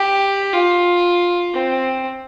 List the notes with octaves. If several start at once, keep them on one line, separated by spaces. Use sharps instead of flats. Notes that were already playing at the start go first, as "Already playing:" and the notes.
Already playing: G4
F4
C4